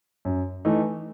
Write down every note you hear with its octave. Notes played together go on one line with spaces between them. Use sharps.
F#2
E3 A3 D#4